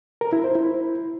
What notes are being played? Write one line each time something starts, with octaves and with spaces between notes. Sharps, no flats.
A#4
E4
C5
E4